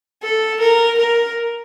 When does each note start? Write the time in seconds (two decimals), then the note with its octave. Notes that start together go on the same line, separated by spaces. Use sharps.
0.22 A4
0.60 A#4
0.98 A#4